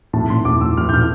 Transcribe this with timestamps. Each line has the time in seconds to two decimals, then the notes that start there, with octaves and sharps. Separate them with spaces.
0.13 A2 A5
0.30 A2 C6
0.45 A2 D6
0.61 A2 E6
0.77 A2 F6
0.89 G6
0.94 A2 F6